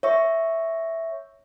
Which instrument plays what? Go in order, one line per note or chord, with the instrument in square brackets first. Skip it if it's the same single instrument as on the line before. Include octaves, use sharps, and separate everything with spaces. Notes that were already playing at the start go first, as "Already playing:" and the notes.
[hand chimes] C#5 E5 C#6